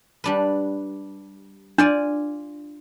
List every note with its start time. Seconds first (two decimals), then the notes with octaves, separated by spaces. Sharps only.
0.24 G3 D4 B4
1.78 D4 F4 D5 G#5